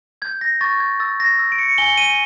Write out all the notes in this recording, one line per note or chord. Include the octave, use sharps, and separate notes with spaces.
G6 G#6
A#6
C#6 A6
G#6
E6 A6
A#6
E6
D7
C#7
G#5 G7
D#7